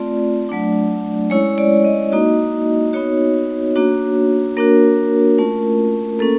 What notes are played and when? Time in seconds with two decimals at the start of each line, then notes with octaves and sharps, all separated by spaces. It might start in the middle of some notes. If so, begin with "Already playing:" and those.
Already playing: A3 C4 F4 D5
0.49 F#3 A3 D4
1.30 G#3 C#4 E4 C#5
1.58 D5
1.85 D#5
2.12 A#3 D#4 F#4
2.93 B3 D#4 F#4 C#5
3.76 A#3 D4 F#4
4.57 A#3 D4 F#4 A#4
5.38 A3 C#4 F4
6.19 A#3 C#4 A4